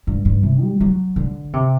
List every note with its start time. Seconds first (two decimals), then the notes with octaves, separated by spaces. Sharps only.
0.07 G2
0.25 G2
0.43 C3
0.62 G3
0.81 F#3
1.16 D3
1.53 C3